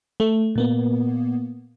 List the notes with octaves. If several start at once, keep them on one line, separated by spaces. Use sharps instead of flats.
A3
A#2 A#3 B3